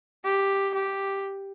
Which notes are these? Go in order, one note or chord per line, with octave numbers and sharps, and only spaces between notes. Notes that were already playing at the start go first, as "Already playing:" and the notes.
G4
G4